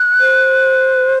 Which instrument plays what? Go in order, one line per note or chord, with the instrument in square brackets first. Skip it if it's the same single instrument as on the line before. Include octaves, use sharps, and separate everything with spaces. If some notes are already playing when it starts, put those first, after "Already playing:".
Already playing: [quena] F#6
[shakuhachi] C5